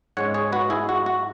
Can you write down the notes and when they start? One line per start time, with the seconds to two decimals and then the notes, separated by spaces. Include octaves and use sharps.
0.17 G#2 G#3 C#4 C#5 F#5
0.34 G#4 C#5
0.52 F#4 B4
0.70 E4 G#4
0.89 F#4
1.06 F#4